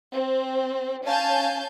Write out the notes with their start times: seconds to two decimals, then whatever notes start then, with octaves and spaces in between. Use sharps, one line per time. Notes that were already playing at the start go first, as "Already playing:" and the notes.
0.14 C4
1.05 C#4 F5 G#5 A5 G6